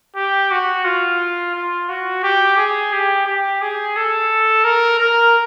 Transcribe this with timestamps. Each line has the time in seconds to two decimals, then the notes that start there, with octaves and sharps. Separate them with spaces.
0.16 G4
0.51 F#4
0.85 F4
1.54 F4
1.89 F#4
2.23 G4
2.57 G#4
2.93 G4
3.26 G4
3.62 G#4
3.96 A4
4.64 A#4
4.99 A#4